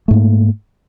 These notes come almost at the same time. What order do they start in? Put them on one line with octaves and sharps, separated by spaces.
A3 G#2 A#3